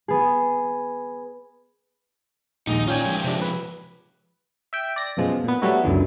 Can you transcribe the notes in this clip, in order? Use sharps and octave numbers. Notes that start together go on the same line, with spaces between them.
B3 G#4
A#1 D#2 G#3 D#4
C#4 F4 D5 G5 G#5
F3 G#3
C3 D4
B4
E5 G5
D5 A#6
F#2 B2 F3 G#3
A#2 B3
F#3 G3 A3 B3 E4 F#4
C#2 F#2 B2 D3 E3